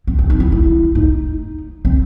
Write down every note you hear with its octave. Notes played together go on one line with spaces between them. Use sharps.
C4
C4
D#4
E4
E4
D#4
C4